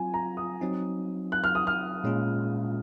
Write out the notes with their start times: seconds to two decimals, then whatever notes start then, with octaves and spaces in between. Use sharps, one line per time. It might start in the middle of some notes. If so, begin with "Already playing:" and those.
Already playing: F#3 C4 F4 G#5
0.14 A#5
0.37 D#6
0.61 F#3 C4 D#4
1.32 F#6
1.44 F6
1.55 D#6
1.67 F6
2.04 A#2 G#3 C#4 F4